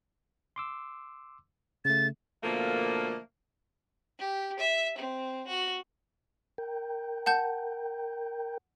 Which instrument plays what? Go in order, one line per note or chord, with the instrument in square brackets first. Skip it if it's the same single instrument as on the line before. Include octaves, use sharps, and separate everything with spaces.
[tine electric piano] C6 D6 E6
[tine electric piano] C#3 A3 [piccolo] A6
[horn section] B2 D3 F3 A3 A#3
[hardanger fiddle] G4
E5
C4
F#4
[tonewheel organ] A#4 G5
[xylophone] F#5 A5 G6